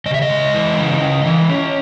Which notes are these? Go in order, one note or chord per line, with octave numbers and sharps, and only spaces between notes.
C#3 D#5
E5
D#5
G#3
E3
C#3
C#3
E3
C#4